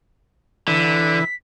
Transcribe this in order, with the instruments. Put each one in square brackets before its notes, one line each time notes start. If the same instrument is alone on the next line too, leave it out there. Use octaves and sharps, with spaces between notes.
[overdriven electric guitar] D3 [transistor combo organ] E3 [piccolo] B6